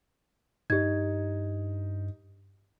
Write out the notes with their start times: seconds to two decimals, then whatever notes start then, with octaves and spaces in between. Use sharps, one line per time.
0.70 G2 D#4 G4 G#6